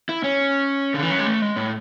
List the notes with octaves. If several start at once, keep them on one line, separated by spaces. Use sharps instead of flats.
E4
C#4
D3
E3
F#3
G#3
A3
G#3
A2